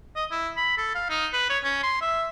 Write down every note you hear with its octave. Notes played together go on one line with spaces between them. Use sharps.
D#5
E4
B5
A4
F5
D#4
B4
C#5
C#4
C6
E5